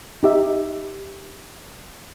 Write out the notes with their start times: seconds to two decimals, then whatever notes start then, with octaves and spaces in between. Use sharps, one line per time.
0.23 D#4 G4 E5